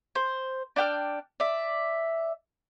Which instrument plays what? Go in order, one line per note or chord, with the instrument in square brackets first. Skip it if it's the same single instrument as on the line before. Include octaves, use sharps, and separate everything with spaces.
[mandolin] C5
D4 D5 G5 F6
D5 E5